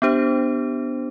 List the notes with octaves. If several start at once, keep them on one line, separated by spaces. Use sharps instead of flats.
B3 D4 G4 C5